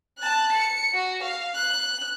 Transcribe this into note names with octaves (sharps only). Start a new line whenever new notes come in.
A5 F#6
C#7
F#4
F5
F#6